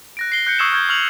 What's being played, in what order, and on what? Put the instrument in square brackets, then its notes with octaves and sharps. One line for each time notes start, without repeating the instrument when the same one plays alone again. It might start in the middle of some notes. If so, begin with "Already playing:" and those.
[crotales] F#6 A#6 D7
C7 G7
F#6 G6 C#7
C#6 D#6 E6 G#6 C7 E7
C#6 F6 G6 G#6 G7
C#6 F6 F7 F#7